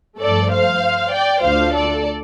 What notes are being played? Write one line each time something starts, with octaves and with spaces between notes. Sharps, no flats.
G2 F3 A3 A4 D5
C5 F5
D5 G5
D2 D3 A3 D4 F4 C5 F5
A4 D5